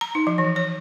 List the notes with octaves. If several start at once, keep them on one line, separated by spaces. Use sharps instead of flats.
A#5
D#4
F3
E3
C#5